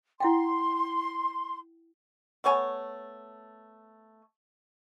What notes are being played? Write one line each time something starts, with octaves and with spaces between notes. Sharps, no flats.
E4 F#5 G5 C6
A3 B3 C#5 G#5